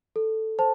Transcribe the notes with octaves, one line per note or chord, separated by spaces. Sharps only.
A4
C5 A5